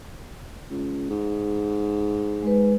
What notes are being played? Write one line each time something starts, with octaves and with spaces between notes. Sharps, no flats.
C#2
G#2
G#3 B4